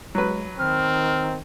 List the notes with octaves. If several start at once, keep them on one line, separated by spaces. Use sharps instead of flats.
F#3 G#3 B4
D#3 C4 F6